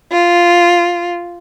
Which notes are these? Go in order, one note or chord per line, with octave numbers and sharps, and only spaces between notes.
F4